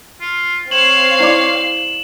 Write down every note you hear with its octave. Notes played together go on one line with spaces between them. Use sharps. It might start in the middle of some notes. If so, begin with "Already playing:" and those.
F4
C4 C#5 F5 C7 E7 F#7
E4 D5 D6